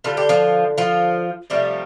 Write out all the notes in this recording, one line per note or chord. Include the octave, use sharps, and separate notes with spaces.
D3 G3 F4
G4
F3 F4
F3 F4
C3 F3 G3 A3 G4